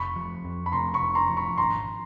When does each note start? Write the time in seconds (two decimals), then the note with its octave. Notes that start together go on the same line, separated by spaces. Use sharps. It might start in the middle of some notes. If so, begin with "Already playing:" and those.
Already playing: F1 B5 C#6
0.16 F3
0.44 F2
0.66 B5
0.72 C3 A#5 C6
0.94 B5 C#6
1.00 F1
1.15 A#5 C6
1.29 F3
1.37 B5 C#6
1.57 G#1 A#5 C6